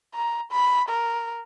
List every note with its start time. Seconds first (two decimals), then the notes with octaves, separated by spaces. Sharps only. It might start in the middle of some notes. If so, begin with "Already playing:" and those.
0.14 A#5
0.52 B5
0.89 A#4